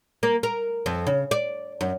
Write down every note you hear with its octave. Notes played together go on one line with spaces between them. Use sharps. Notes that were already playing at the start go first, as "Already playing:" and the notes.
A#3
A#4
F2
C#3
D5
F#2